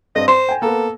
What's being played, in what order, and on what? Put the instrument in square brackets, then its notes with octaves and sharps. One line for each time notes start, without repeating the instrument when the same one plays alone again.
[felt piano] G2 C4 A#6 [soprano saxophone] D#5
[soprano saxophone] C5 [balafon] C6 [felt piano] E7
[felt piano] G5 G#5
[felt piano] A#3 B3 [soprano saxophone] A4